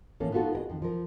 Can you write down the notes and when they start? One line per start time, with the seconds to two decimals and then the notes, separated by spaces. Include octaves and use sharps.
0.20 A2 E3 A#3 C#4 A4
0.32 B3 D#4 F4 F#4 A4
0.53 G#4 A#4 D#5
0.69 F2 D#3
0.82 F3 A#4